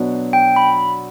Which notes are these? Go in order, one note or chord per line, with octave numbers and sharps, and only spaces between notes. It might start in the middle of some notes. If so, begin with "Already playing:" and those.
Already playing: B2 F#3 B3 D4
G5
B5